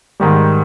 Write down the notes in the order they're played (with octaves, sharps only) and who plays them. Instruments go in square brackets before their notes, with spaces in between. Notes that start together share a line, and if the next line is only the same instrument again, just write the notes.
[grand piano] G#2 D#3 G3